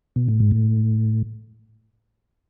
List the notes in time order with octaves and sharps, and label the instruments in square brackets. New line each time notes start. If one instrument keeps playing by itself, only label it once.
[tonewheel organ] B2
A2
G#2
A2